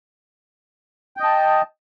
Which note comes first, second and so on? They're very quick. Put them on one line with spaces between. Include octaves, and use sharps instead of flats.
G5 D#5 A5